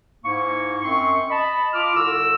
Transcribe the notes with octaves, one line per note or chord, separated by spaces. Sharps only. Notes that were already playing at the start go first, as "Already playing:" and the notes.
G#2 A#3 E4 C#6
F#2 C4 C6 C#6
D#5 A5 B5
F4 D6 F6
C2 D3 F#4 E6